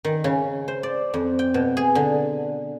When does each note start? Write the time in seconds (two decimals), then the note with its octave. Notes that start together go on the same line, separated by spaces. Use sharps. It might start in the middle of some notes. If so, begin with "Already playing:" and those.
0.05 D#3
0.24 C#3
0.68 C5
0.83 D5
1.14 F2
1.39 G5
1.54 B2
1.77 G#4
1.95 D3